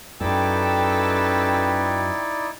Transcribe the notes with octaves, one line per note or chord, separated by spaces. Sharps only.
F#2 C#4 D#4 E4 A4 B4 D5 G5